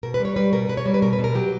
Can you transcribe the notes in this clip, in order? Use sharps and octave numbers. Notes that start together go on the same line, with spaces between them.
B2 A#4
B4
G3
C#5
G3 B4
B2 A#4
B2 B4
C#5
G3
B4
B2 A#4
B4
B2
A#4
F#3 G4